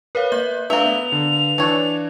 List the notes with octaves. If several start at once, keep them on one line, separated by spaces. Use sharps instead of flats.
A#4 B4 C#5 F5
A#3 E5 G6
A3 A#3 D4 B4 E5 F5 F7
B3
D3
E3 D4 A4 C#5